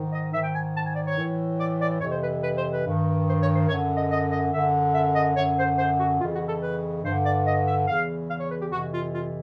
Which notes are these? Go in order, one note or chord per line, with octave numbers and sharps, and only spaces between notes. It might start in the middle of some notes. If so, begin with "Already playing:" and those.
Already playing: G#2 D#3
D#5
G#2 D#3 E5
G5
G#5
A5
G#5
D5
C#5
A2 E3
D5
D5
F2 C3 E3 C#5
C5
B4
B4
C5
B4
G2 D#3
C5
C#5
C5
F#2 D3 C#5
D#5
D#5
D#5
F#2 D3 E5
E5
D#5
F#2 D3 C#5
C5
C5
F#4
F2 C#3 E3 F4
F#4
A4
B4
G2 D3 C5
D5
D#5
E5
E2 C#3 E3 F5
F5
C#5
B4
G4
F2 C3 E3 F#4
F4
F4